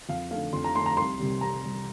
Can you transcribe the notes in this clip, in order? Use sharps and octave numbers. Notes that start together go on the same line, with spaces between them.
F2 F5
D3 A3 F5
F2 C6
A#5
D3 A3 C6
A#5
C2 C6
C3 G3
C2 A#5
C3 G3